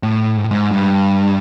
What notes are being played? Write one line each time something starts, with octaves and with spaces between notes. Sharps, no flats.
A2
G#2
A2
G#2
G2